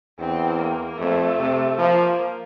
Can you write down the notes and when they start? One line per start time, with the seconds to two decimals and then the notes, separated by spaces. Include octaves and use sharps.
0.19 E2 C4
0.58 A#3
0.98 F2 A3
1.39 C3
1.78 F3 A#3